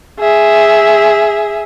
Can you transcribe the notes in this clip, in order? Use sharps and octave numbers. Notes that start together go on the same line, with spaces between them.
G#4 E5